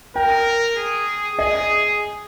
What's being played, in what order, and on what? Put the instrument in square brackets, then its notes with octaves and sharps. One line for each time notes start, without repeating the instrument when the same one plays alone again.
[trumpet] A#4 [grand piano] G5
[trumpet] G#4
[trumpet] G#4 [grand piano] D#5